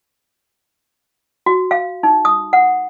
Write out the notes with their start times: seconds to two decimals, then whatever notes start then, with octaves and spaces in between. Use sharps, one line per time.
1.46 F#4
1.71 F5
2.03 D#4
2.25 D#6
2.53 F#5